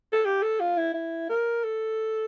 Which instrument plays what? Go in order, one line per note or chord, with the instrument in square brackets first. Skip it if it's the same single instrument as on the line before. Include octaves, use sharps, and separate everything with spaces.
[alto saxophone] A4
G4
A4
F4
E4
E4
A#4
A4